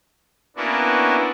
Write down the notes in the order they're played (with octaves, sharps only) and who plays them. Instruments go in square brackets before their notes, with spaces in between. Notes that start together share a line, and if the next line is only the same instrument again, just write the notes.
[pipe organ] A#3 B3 C#4 D4 E4 F#4